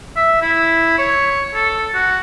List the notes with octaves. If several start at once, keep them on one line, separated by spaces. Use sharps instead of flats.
E5
E4
C#5
A4
F#4